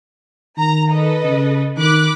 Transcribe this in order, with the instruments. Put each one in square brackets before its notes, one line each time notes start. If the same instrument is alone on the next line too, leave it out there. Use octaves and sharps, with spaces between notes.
[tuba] D#3 [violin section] A#5
[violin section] A4 B4 D#5
[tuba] C#3
[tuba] D#3 [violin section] B5 D6 F#6